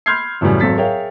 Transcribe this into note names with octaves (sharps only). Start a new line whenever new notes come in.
B5 C6 F6 G6 G#6 C7
F#2 A2 C#3 E3 F#3 G3
G#1 F#3 C4 A4 A6 B6
G#4 A#4 C#5 E5 F5 G5